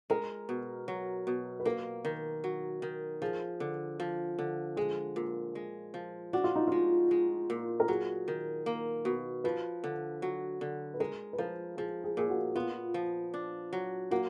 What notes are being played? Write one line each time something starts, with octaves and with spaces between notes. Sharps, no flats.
G#3 A#4
B2
F#3
B2
B4
A#3 A#4
D#3
F#3
D#3
F3 G#4
D3
F3
D3
G#3 G#4
A#2
G#3
F3
D4 F#4
F4
D#4
G#3 F4
G#3
A#2
A#4
F#3 G#4
D#3
A#3
B2
F3 B4
D3
F#3
D3
B4
G#3 A#4
B4
F3 A#4
F3 G#4
G#4
A#2 G#4
F#4
B3 F4
F3
D4
F#3
A#3 F#4